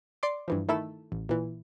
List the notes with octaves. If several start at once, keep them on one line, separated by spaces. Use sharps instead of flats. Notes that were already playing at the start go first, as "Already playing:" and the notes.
D5 C6 D6
G2 E3 F3
D#3 A3 E4 A4 E6
A1
A#2 E3